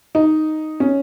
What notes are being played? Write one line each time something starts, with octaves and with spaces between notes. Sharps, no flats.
D#4
C#4